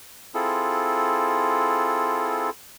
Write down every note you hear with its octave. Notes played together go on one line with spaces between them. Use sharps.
C4 E4 F4 G#4 A4